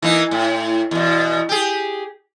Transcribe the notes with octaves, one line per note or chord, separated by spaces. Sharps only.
E3 A#3 D#4
A2
E2 B2
G4 G#4